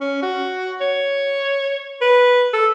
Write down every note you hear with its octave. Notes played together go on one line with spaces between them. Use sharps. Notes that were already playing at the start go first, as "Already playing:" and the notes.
C#4
F#4
C#5
B4
A4